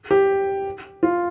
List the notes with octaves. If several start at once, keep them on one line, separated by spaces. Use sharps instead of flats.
G4
F4